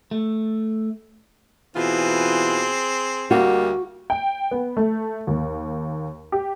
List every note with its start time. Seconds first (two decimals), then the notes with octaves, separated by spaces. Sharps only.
0.11 A3
1.76 B2 E3 C4 F4 G#4
3.31 D2 G3 A#3 F#4
4.10 G5
4.51 B3
4.77 A3
5.27 D#2
6.32 G4